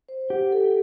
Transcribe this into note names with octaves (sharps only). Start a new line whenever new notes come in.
C5
G4 F#5
A4